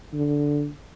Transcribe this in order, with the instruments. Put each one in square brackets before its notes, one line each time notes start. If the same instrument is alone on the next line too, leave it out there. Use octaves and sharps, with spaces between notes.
[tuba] D3